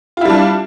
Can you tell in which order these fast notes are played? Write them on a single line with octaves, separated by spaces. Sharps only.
F4 E4 G3 D4